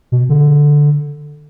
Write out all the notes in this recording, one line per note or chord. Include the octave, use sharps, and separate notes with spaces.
B2
D3